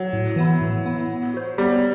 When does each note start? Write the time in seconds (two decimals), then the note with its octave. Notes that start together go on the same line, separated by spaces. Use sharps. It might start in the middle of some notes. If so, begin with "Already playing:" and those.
Already playing: F#3
0.13 A2
0.36 E3 B3 E4
0.61 A2
0.85 E3 B3 E4
1.10 B3
1.34 F#4 C5
1.58 G3 B3